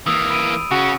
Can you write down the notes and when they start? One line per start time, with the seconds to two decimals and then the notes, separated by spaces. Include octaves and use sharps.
0.07 E3 A#3 D#6 E6 F7
0.30 B5 D7 D#7
0.71 C#3 C#4 F#4